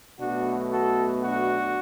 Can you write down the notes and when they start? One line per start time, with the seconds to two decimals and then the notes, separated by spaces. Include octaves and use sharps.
0.19 B1 B2 A3 D4 F#4
0.71 F#4 A4
1.23 D4 F#4